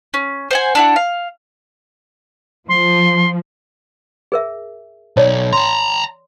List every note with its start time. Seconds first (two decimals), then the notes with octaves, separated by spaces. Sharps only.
0.14 C#4
0.51 C5 F#5 G#5
0.75 D4 E4 F#5
0.96 F5
2.69 F3 C6
4.32 G#4 A#4 E5
5.17 B1 C#5 D5 A5
5.53 A5 A#5 C6